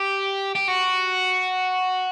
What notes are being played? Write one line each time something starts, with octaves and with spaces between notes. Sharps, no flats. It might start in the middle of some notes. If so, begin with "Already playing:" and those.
Already playing: G4
G4
F#4